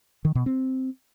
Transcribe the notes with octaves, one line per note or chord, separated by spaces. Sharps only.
D#3
B2
C4